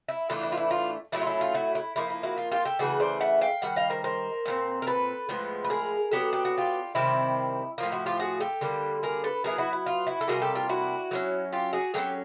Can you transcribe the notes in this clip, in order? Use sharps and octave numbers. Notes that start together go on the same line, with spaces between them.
E4
A2 E3 A3 D4 F4
E4
F4
E4
F4
A2 F#3 A3 C#4 E4
F4
E4
F4
E4 F#4
E4
F3 A#3 D#4 E4
E4
E4 F#4
F4
F4 G4
G4 A4
C#3 E3 A3 F#4 G#4
C5 D5
E5 F#5
F5 G5
D#3 G3 F#5
D#5 F5
A#4 C5
A#4 C5
A#2 G3 C4
A#4
A4 B4
A2 F3 G#3 B3
B4
G#4 A#4
F#3 B3 D4 G4 A4
G4
F#4
F4 G4
C3 D#3 G3 C4 E4
A2 F3 A#3 F4
E4 F#4
F4 G4
F#4 G#4
G4 A4
D3 G3 A#3
G#4 A#4
A4 B4
F#3 B3 E4 G#4 A#4
E4 F#4
E4
F4
E4 F#4
A4
C3 E3 G3 A#3 F#4 G#4
G4 A4
F4 G4
E4 F#4
F#3 A#3 C#4
F4 G4
F#4 G#4
F#3 A#3 C#4 G4 A4